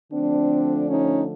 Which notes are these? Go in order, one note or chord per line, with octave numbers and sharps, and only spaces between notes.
D3 F3 A3 C4 D4
C#4 D#4